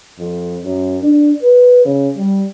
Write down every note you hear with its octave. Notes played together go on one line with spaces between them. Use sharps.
F2
F#2
D4
B4
C#3
G3